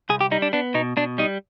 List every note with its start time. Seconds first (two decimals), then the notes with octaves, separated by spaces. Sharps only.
0.09 C2 G#4
0.21 G4
0.31 G3 D#4
0.42 D4
0.53 B3 D4
0.74 B2 D#4
0.97 B2 D4
1.18 G3 D#4